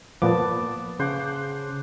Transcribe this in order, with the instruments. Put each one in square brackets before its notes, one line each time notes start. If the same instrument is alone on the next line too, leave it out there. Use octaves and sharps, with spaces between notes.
[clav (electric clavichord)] A#2 F3 [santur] B3 A5 [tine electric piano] D6
[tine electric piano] C#3 [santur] C5 F#5 D6